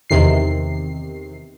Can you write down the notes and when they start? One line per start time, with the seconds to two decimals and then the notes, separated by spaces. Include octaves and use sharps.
0.10 E2 C3 D#3 C7